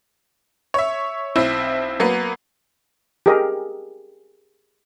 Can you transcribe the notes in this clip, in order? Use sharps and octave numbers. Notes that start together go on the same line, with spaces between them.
C#5 E5
B1 C4 E4
F#3 A#3 B3
G4 G#4 A#4 D#5